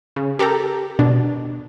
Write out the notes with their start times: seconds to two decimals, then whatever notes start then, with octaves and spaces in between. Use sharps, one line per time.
0.16 C#3
0.39 G4 A4 A#4 A#5
0.99 B2 D4